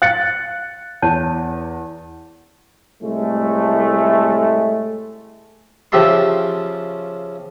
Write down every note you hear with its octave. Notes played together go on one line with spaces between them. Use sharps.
F5 F#6 A6 C#7
E2 C#5 A5
C2 A2 G#3 A3
C#3 F3 G4 E5 A5 C6